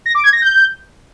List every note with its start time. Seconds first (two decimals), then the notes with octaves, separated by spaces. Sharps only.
0.06 A#6
0.15 D6
0.24 G#6
0.33 A#6
0.42 G6